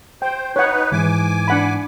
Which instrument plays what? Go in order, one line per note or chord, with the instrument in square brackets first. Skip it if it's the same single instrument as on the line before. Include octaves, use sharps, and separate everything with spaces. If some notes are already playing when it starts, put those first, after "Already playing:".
[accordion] C5 [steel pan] G5
[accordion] D#4 B4 [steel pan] C#5 F#5
[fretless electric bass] G#2 E3 [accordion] G#5 D6
[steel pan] D4 F#5 B5